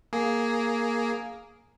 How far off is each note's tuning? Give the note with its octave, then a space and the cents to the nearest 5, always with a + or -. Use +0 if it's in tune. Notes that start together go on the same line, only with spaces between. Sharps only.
A#3 +0 G#4 +0